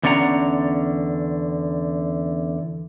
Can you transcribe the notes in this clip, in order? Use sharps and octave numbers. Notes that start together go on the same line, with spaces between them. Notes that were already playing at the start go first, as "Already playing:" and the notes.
E2 D3 C#4 D5 F#5 A#5